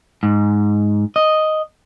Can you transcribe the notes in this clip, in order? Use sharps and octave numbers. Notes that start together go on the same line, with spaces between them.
G#2
D#5